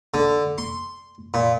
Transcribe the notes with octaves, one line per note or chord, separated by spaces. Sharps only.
D3
C6
A#2